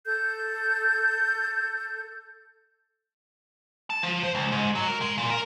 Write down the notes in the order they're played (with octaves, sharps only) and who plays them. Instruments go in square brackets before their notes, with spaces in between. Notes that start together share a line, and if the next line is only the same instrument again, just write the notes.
[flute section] A4 G6
[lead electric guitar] A5
F3
C5
C#2
G#2
F#3
A#4
G#3
A#2
A#4